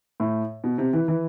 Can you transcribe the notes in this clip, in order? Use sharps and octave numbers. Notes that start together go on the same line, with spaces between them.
A2
B2
C3
E3
E3